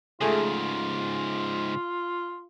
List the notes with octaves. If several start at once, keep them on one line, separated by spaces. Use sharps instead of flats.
G#2 C#3 A3 F4 G#4